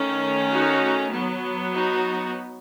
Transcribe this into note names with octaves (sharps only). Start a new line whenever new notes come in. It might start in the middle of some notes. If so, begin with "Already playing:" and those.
Already playing: D#3 A3 C#4
D#4 F#4
F#3 B3
D#4 F#4